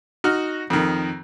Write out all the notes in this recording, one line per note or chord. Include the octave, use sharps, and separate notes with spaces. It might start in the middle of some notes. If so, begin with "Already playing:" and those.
D#4 F#4 F6
F2 D#3